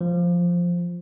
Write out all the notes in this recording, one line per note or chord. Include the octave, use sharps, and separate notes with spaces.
F3